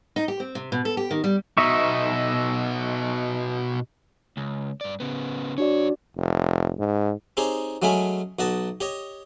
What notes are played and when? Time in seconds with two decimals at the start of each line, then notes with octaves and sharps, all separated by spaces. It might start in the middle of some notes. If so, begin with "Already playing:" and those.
0.16 D#4
0.28 G4
0.40 C4
0.55 C3
0.72 B2
0.85 A4
0.97 G4
1.11 D#3
1.24 G3
1.58 B2 D#4 D#5 E5 C#6
4.37 C#2
4.81 G2 D5
5.00 C#3 B3
5.58 F#2 D4 F#4 C#5 D5
6.16 F1
6.79 G#2
7.37 C4 D#4 G4 G#4 C#5
7.82 F#3 G#3 A3 C#4 G#4 B5
8.39 B1 F#4 D#5 A5
8.81 G4 C#5 D#5